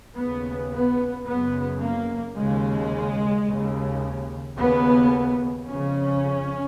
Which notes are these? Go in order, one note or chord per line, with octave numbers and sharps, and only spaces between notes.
D#2 C#3 B3
B3
F#2 C#3 B3
A#3
D#2 C#3 G#3
D#2 C#3
D#2 C#3 B3
F2 C#3 C#4